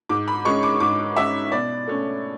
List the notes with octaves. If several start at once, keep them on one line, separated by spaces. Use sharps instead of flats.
G#2 D6
B5
G#3 C#4 C#6
D6
G#2 D6
G#3 C#4 E5
B2 D5
A3 C#4